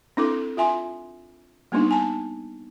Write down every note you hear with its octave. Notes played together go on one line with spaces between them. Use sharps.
C4 D4 E4 A4 D6
F4 E5 G#5 C6
G3 A#3 B3 D4 D#4
G#5 A5